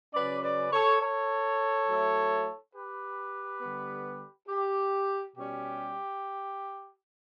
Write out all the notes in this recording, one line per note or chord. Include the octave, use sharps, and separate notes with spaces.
C#3 F#3 C#4 B4 D5
B4 D5
A4 C#5
A4 C#5
F#3 A3 E4
G4 B4
D3 G3 B3
G4
B2 G3 C#4 G4